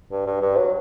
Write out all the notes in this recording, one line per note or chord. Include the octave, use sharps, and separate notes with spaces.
G2
G2
G2
F#3